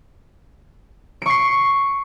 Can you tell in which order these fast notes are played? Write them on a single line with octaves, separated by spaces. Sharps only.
D7 C#6 C7